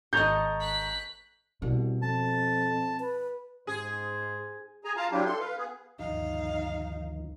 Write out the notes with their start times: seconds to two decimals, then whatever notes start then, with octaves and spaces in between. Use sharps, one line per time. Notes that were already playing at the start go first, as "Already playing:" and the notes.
0.13 G#1 A4 D#5 A#5 C#6 G6
0.60 F#6 B6
1.62 C2 B2
2.02 F2 A5
3.00 B4
3.67 G#2 G#4 C5
4.84 G#4 G#5 A#5
4.97 F4 F5 A5 A#5
5.12 F#3 D4 E4 F4 G4
5.25 A4 C6
5.39 B4 F5
5.58 B3 G#4
5.99 G1 D2 D#3 F3 D#4 F5